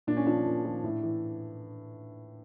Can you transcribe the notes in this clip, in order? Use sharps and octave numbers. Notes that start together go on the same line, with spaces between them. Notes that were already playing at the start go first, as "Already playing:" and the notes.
A#2 D4
C#4
F3 D4
A#2
F3
A2
E3